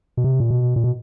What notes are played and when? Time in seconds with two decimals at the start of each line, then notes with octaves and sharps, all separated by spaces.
0.17 B2
0.24 C3
0.40 A#2
0.50 B2
0.76 A#2
0.84 B2